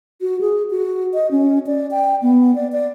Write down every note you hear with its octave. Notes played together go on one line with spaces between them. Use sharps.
F#4
G#4
F#4
D#5
C#4
D5
G5
B3
D5
D5